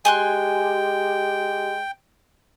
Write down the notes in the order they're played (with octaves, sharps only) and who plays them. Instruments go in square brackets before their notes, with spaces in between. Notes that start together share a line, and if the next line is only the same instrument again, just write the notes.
[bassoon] G#3 [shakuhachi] G4 [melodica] G5 [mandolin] G#5 C6 F#6